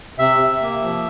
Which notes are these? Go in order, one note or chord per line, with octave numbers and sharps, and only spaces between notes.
C3 E5
C3
A#3
F3